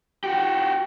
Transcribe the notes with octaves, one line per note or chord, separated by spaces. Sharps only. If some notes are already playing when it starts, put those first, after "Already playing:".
F#4 G4